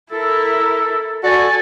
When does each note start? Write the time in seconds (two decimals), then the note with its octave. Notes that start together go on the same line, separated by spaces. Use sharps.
0.11 E4 A4 A#4
1.23 F#4 A4 D5 G#5